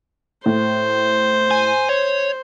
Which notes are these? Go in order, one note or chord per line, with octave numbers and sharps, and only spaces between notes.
A2 C5
G#5
C#5